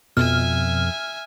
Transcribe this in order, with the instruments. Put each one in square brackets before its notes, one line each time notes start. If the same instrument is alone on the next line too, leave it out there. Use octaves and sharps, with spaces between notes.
[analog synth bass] F2 [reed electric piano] B2 [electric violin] E5 G#5 [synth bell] F6